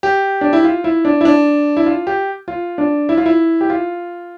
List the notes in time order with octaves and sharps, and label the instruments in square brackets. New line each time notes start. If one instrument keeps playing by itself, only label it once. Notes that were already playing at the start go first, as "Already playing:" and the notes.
[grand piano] G4
D4
E4
F4
E4
D4
E4
D4
E4
F4
G4
F4
D4
E4
F4
E4
G4
F4